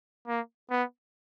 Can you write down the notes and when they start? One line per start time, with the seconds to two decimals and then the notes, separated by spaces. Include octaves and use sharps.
0.28 A#3
0.70 B3